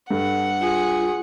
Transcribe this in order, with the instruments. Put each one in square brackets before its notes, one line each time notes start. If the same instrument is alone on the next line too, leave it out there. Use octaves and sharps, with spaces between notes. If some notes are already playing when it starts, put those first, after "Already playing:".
[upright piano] G2 [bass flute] A4 [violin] F#5
[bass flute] F4 [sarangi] G#4